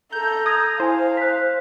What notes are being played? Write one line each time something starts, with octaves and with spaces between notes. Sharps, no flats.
A4 A#5 G6
D#6 G6 G#6 A#6
E4 C5 F5 G#5
F#6 B6